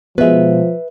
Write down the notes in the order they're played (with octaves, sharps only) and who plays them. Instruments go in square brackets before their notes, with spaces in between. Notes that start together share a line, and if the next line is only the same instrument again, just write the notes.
[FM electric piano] B2 G#3 [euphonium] F3 [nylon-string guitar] B4 E5